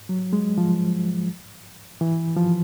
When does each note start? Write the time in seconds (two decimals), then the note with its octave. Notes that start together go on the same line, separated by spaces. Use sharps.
0.09 F#3
0.33 G#3
0.58 F3
2.01 E3
2.37 F3